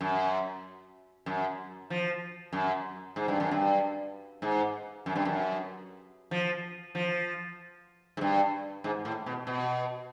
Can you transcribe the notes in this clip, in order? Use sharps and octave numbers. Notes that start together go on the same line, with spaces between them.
F#2
F#2
F3
F#2
G#2
G2
F#2
G2
G#2
F#2
G2
F#2
F3
F3
G#2
G2
G#2
A2
B2
B2